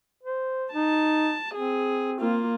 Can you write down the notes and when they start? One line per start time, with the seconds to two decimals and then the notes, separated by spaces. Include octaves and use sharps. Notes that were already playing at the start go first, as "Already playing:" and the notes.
0.23 C5
0.73 D#4 A5
1.55 C4 G#4
2.20 A#3 F4